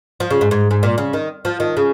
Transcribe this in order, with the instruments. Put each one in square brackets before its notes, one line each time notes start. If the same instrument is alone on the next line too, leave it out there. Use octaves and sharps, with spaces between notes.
[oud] F3
C#3
G#2
G#2
G#2
A#2
C#3
D#3
F3
D#3
C#3